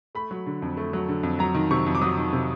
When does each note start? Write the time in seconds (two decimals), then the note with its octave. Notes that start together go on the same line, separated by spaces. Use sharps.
0.15 A3 B5
0.31 F#3
0.46 D3
0.62 F2
0.77 A3
0.93 F#3
1.08 D3
1.23 F2
1.39 F#3 A#5
1.54 D#3
1.71 C3 C#6
1.86 F2
1.95 D6
2.01 F#3 D#6
2.17 D#3
2.33 C3